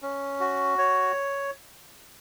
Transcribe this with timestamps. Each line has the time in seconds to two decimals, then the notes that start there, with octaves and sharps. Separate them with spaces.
0.02 C#4
0.40 F#4
0.78 C#5